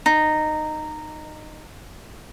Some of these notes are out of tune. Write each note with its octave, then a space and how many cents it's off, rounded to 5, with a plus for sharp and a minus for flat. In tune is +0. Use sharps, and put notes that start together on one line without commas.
D#4 -15